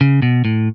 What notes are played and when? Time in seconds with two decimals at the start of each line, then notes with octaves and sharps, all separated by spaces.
0.01 C#3
0.22 B2
0.45 A2